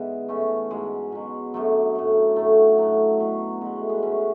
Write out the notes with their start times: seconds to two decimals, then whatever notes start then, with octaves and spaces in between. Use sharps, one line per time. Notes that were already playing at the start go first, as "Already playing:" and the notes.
Already playing: G#2 E3 G#3 B3
0.28 A2 E3 A3 C#4
0.71 G#2 F#3 G#3
1.12 B2 F#3
1.54 F#2 D3 F#3 A3
1.95 A2 F#3
2.36 A2 F#3 A3
2.78 A2 F#3
3.20 B2 F#3
3.61 B2 F#3 G#3
3.76 A3
3.89 G#3 B3
4.02 G#2 E3 A3 C#4